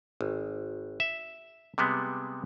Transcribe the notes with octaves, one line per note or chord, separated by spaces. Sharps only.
G#1
E5
C3 G3 G#3 B3